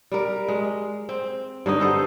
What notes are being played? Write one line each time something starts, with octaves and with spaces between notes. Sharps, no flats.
G3 A#4
G#3
C4
G2 D3 D#4 D#5
B3 A4 C5